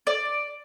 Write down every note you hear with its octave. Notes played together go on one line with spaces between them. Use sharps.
D5